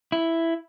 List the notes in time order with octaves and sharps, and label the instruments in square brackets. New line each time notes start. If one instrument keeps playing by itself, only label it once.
[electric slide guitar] E4